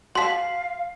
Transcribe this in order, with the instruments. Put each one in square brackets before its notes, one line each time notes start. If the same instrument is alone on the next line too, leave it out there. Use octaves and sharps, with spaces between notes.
[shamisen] F#4 A5 [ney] F5 [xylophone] C6 B6